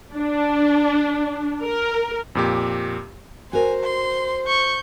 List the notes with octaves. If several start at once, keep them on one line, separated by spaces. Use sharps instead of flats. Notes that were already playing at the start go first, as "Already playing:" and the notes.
D4
A#4
F2 A#2 G4
F#4 A#4 C5 G#5
C6
C#6 G6